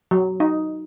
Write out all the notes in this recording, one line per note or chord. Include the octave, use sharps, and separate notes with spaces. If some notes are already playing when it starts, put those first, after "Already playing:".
F#3
D#4